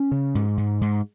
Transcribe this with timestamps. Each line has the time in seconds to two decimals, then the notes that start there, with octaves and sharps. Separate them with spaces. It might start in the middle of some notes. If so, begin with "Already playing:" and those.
Already playing: C#4
0.12 C#3
0.35 G#2
0.58 G#2
0.81 G#2